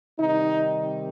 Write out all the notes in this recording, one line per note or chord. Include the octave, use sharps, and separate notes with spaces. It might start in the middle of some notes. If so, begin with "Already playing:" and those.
C3 D#3 G3 D#4